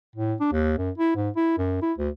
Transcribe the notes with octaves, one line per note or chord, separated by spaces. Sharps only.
A2
D4
D#2
F#2
E4
G#2
E4
F#2
E4
D2